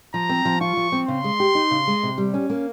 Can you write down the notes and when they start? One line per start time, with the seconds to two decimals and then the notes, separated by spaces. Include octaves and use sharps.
0.14 F3 A#5
0.29 C4
0.45 F3
0.61 F4 C#6
0.77 F3
0.92 C4
1.08 C#3 C6
1.24 G#3
1.40 G4
1.55 D#4
1.71 C#3
1.87 G#3
2.03 C3
2.18 G3
2.34 C#4
2.50 A#3